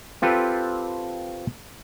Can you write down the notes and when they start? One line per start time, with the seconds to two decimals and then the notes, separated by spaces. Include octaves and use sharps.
0.22 C4 F4 G4 A4 B4